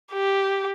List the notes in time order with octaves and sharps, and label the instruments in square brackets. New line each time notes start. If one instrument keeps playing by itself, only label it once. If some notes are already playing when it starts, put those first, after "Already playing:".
[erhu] G4